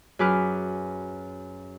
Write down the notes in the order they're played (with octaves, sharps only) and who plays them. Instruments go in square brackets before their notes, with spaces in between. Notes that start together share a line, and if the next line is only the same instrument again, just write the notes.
[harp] F#2 G#4 B4 D6 F6